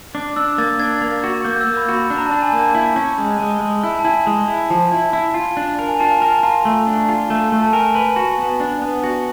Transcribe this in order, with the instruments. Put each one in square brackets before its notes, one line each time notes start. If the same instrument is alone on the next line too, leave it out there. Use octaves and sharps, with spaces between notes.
[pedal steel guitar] D4 [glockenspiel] D6
[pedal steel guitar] D4 [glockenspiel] E6
[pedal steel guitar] A#3 [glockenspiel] A6
[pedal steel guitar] D4 [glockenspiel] G#6
[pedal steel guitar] A#3
F#4
[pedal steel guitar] A#3 [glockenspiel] G6
[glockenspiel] E6
[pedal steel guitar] A#3
[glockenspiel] B5
[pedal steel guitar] F#4 [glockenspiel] B5
[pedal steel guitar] D4
[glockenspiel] A#5
A5
[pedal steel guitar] D4
[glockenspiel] G#5
[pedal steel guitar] A#3
[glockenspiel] A5
[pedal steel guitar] E4
C#4
G#3
G#3
G#3
E4
[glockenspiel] A5
[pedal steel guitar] E4 [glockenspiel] G#5
[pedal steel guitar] G#3
E4
[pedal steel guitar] F3 [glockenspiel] A5
[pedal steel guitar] E4
E4
F4
D4
A#4
[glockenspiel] G#5
[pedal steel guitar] F4 [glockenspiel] A5
[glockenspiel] G#5
[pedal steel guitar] A#4 [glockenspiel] A5
[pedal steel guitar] F4 [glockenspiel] A#5
[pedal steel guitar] A3
D4
F4
[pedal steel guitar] A3 [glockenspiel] A5
[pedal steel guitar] A3
[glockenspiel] A5
[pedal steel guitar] A#4 [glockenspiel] G#5
[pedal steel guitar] B4 [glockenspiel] G#5
[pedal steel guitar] F#4
B3
D4
B3
F#4